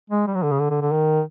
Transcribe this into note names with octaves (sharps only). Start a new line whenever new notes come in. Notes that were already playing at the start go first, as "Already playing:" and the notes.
G#3
G3
F#3
D3
C#3
D3
D3
D3
D#3